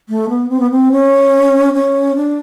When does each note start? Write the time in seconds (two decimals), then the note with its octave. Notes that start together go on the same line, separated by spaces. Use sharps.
0.09 A3
0.29 B3
0.49 C4
0.60 B3
0.71 C4
0.92 C#4
1.74 C#4
2.16 D4